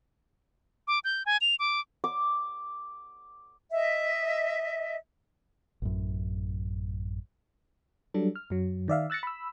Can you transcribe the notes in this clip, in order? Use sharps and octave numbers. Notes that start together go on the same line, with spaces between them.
D6
G6
G#5
F7
D6
D6
D#5 E5
A1 F#2
F#3 G3 D4 A4
F6
F#2 F#3
D#3 D5 E5 F5
E6 F#6 A6 A#6 C#7
B5 E6